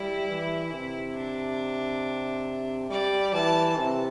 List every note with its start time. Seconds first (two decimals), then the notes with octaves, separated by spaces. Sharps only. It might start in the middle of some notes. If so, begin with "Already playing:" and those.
Already playing: G3 E4
0.29 E3
0.72 C3
1.15 D4
2.90 G3 D5
3.33 E3 A5
3.77 C3